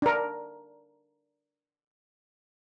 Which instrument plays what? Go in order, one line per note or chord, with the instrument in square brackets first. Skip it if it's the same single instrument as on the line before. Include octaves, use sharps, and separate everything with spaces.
[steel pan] D4 A#4